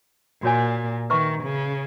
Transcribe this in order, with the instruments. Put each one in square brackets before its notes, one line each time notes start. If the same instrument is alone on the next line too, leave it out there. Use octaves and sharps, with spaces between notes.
[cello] A#2 [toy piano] F#4 C#5 G#5
[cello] D#3 [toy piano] B4 E5 A#5 C#6
[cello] C#3